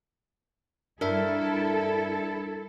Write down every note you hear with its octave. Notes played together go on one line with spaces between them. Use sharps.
G2 D4 E4 A4 A#4 E5